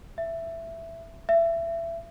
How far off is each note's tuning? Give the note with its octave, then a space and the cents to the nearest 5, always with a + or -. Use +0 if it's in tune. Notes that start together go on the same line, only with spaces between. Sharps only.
E5 +10
E5 +25